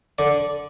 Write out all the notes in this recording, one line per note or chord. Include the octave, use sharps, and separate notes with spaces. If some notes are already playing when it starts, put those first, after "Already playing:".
D3 D5